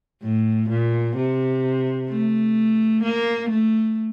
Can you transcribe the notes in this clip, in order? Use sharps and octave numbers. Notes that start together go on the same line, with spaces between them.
A2
A#2
C3
A3
A#3
A3